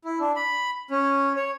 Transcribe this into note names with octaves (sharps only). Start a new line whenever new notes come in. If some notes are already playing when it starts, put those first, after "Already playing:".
E4
D4
B5
C#4
C#5